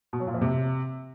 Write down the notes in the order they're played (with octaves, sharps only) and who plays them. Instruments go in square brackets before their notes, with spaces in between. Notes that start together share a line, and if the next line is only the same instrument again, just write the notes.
[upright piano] B2
F#3
A#2
F2
C3